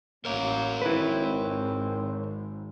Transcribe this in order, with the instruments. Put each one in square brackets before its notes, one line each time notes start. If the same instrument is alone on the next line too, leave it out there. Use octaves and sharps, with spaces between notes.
[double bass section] A1 [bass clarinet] A#3 [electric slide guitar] A#4 C#5
[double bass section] G#1 [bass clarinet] C4 [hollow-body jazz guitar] E4 B4